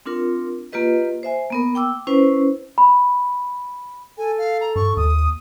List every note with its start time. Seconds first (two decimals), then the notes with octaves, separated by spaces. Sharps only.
0.06 C4 D4 F4 A#4
0.73 A#3 F4 G4 B4 D#5
1.23 C5 E5 G#5
1.50 A#3 B3 A#4
1.75 G5 D6 E6
2.07 C#4 E4 B4 C5
2.78 B5
4.18 A4 G#5
4.38 F5
4.61 A#5
4.76 G2 C#6
4.97 D#2 D#6